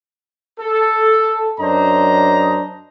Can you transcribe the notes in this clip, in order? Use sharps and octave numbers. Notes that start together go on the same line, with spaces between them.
A4
F#2 F#3 D4 C5 D#5 A#5